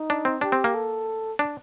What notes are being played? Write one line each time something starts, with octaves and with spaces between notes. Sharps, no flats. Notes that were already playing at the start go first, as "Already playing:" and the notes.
Already playing: D#4
D4
C4
D4 G4
C4
A#3
A4
D4